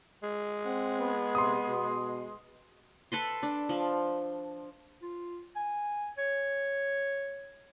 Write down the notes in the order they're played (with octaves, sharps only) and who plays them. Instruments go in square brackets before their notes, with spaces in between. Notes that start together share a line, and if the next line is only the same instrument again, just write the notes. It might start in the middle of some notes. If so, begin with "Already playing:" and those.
[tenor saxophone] G#3
[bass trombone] C4 [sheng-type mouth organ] F#5
[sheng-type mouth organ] B3
[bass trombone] C3 [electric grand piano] C6 D#6
[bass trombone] B2
[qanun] A4 B4 C6
D4
F3
[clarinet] F4
G#5
C#5